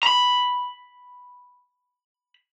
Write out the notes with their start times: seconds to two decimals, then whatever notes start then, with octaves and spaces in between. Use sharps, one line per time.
0.03 A#5 B5